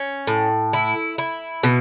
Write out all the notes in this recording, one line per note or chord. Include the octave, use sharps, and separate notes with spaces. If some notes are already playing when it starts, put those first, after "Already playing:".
Already playing: C#4
A2
E4
E4
B2